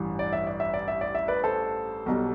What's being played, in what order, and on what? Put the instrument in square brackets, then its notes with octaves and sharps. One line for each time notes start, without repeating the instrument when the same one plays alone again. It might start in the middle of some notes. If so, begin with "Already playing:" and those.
Already playing: [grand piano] A1 G2 E3
D5
E5
D5
E5
D5
E5
D5
E5
B4 D5
A4 C5
B1 B2 G3